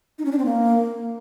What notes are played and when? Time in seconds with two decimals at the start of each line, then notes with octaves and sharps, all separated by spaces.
0.19 D#4
0.25 C#4
0.32 D4
0.39 C4
0.45 A#3